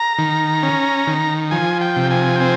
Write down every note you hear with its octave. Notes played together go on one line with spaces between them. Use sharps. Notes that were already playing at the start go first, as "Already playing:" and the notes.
Already playing: A#5
D#3
C#4
D#3
F3 G#5
G5
C3
G#5
G5
C4 G#5